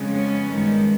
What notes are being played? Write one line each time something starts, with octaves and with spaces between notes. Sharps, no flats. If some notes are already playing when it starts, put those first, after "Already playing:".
Already playing: F2 C#3 F3 G#3
B3 C#4
G2 D#3 G#3